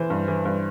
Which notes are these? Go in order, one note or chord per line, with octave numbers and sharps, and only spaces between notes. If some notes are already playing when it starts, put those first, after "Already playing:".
Already playing: E3 C5
G2
E3
G2